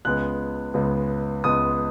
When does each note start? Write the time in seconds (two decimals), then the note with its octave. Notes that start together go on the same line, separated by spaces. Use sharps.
0.05 C#2 C#3 G#3 B3 F#6
0.74 C#2 C#3 G#3 B3
1.44 C#2 C#3 G#3 B3 D#6